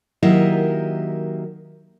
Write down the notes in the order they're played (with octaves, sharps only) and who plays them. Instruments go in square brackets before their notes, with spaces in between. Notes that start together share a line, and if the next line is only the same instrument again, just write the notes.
[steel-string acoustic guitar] D#3 F#3 A#3 E4 G4 D#5